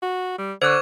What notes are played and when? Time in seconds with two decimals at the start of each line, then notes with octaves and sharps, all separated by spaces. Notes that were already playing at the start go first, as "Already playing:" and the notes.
0.02 F#4
0.38 G3
0.62 D3 C5 C#6 D6 F#6 G#6